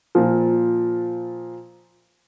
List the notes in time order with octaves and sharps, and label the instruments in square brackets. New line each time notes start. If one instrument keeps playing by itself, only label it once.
[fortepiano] A#2 F3